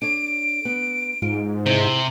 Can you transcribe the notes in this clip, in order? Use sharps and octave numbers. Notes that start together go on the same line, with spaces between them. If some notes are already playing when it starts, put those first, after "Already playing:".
D4 A4 C#5 D7
B3
G#2 F4
C3 E4 C5